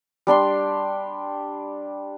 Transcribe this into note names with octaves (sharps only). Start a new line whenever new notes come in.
G3 D4 G5 C6